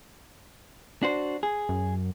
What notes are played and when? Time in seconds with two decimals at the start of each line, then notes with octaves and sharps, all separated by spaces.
1.03 D4 F#4 C5
1.43 G#4
1.69 F#2